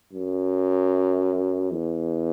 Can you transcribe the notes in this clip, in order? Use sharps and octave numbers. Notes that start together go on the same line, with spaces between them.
F#2
E2